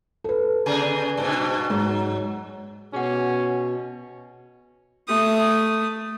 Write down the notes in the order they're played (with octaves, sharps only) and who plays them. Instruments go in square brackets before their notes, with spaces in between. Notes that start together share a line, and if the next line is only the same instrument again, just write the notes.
[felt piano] A4 B4
[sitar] C#3 B3 G#4
G2 B2
[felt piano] G#2 [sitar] F#3
[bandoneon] B2 [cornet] C#4 [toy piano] G#4 F#5
[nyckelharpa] A3 D#6